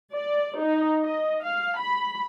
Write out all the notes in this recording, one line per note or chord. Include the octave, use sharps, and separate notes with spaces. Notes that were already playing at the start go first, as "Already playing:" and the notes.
D5
D#4
D#5
F5
B5